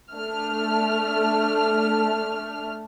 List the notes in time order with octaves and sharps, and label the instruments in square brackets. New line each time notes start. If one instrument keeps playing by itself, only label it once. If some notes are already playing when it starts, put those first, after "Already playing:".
[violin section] A3 D4 F6